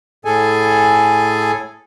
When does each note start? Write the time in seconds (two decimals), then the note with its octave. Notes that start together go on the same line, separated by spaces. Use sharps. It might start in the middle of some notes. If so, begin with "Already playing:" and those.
0.25 A2 G#4 A4 G#5